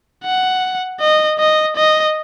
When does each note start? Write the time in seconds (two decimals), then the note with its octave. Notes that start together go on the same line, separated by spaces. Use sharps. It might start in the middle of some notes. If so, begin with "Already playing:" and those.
0.24 F#5
1.00 D#5
1.39 D#5
1.77 D#5